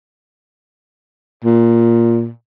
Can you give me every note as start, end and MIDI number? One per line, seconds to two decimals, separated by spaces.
1.44 2.30 46